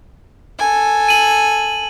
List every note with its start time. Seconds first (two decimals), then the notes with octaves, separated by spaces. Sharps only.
0.59 A4 G#5
1.08 D#7 F#7